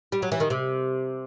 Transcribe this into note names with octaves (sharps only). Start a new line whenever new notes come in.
G3
F#3
E3
D#3
C3